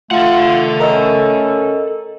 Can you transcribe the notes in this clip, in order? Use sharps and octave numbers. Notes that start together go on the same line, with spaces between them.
A3 F4 A4 F#5
C#4 A#4 D#5 E6